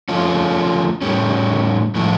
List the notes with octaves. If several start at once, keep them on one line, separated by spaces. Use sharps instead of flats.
F3 A3 C#4 F4
A2 G3 C#4
A2 F3 A3 E4